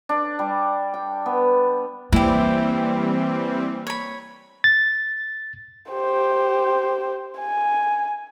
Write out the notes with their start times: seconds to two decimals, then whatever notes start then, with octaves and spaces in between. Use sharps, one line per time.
0.09 D4
0.39 G3
0.94 G5
1.26 B3
2.12 E3 G3 A#3 C4 E4 G4
3.87 C#5 B5
4.64 A6
5.90 G4 C5
7.39 G#5